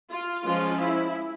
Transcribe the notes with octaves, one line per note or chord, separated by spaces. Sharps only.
F4
F3 G#3 C#4 F4
E4